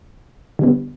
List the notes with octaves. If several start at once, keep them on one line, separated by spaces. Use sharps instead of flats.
D3 G3 B3